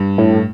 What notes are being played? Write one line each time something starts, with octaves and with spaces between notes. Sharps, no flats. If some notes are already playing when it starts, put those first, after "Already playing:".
Already playing: G2
A2